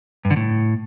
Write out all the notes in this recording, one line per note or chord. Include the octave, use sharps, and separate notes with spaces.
G2
D3
A2